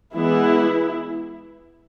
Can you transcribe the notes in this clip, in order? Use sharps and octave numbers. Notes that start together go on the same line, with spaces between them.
E3 G#3 B3 E4